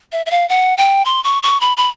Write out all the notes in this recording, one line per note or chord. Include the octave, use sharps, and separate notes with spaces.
E5
E5
F5
F#5
G5
C6
C#6
C#6
B5
B5